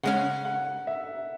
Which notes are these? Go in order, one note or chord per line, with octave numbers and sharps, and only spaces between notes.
C#3 G#3 C#4 F#5
F#5
E5